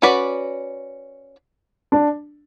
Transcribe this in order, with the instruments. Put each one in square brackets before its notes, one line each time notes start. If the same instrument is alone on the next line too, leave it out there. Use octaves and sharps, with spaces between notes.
[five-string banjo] C#4 F#4 B4 D5
[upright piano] D4